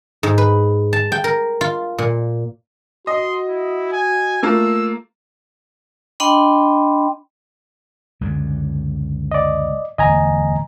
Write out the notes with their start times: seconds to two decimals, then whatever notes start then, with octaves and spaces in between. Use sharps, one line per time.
0.23 G#2
0.38 B4
0.93 A5
1.12 G5
1.24 A#4
1.61 F4
1.98 A#2
3.07 F#4 D#5 C6
3.48 E4
3.92 G#5
4.43 A3 A#3 F4 E6
6.20 D4 D#5 G5 B5 C6
8.21 C#2 F#2 D3
9.31 D5 D#5
9.98 D1 E2 D#5 G#5 A#5